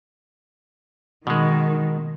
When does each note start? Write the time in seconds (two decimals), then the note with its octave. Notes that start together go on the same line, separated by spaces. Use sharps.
1.27 B2 D#3 G#3